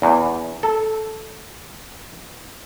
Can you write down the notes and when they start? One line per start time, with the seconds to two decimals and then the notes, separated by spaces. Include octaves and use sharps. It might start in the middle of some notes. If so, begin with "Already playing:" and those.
0.02 E2
0.63 A4